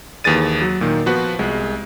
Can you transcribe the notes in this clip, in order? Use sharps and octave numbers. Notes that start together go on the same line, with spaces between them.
D#2 E3 G#4 A6 D#7
F#3
A#2 D#3
F3 B3 F#4 B4 F#5
C2 G#3